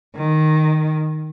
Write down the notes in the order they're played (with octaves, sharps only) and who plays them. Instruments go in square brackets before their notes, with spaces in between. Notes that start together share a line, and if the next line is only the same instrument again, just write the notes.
[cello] D#3